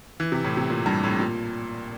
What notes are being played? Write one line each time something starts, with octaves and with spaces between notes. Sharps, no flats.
E3
C3
A2
C3
A#2
G2
A2
A#2